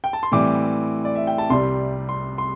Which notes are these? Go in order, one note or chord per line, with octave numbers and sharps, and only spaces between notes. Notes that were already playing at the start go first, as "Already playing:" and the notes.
G5
A5
C6
A2 E3 G3 C4 D6
D5
E5
G5
A5
C2 C3 G3 C6
C6
C6